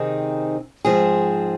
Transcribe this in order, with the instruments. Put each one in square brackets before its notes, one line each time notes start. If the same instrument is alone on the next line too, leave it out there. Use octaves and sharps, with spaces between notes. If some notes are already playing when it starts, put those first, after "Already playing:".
Already playing: [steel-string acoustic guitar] C3 D#3 C4 D#4 G#4
G#2 F3 C4 G#4